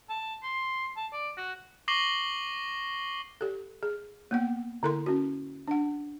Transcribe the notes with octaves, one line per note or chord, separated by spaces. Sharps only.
A5
C6
A5
D5
F#4
C#6 D6 A#6 C7 F#7 G7
G4 A4
G#4
A#3 B3 F#5
D3 E4 A4 A#4 C6
C#4 F#4
D4 F#5